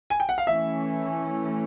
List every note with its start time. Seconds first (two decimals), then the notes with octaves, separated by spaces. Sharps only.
0.10 G#5
0.20 G5
0.29 F#5
0.38 F5
0.47 E3 A3 C#4 E5